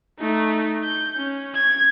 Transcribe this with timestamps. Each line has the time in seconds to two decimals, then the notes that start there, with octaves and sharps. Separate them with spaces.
0.19 A3 D#4
0.83 G6
1.16 C#4
1.54 G#6